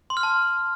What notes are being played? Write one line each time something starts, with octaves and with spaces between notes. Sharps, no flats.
C6
F6
A5